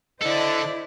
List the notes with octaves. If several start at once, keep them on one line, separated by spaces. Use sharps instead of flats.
D3 E4 A4 C5 D5 D#5